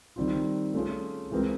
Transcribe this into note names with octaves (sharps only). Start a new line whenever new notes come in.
D#3 G3 C4 F4
A3 C#4 F4 G#4
E3 G#3 C4 F4 A#4